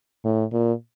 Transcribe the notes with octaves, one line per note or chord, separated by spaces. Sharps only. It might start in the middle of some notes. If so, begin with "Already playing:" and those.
A2
A#2